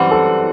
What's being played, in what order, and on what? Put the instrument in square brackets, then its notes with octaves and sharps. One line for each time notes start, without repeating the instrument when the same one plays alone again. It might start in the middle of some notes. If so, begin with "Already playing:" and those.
Already playing: [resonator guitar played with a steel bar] F#2 E3 G3 C4 [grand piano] F#5
[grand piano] A4